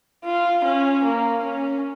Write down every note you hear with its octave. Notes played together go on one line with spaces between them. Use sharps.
F4
C#4
A#3
C#4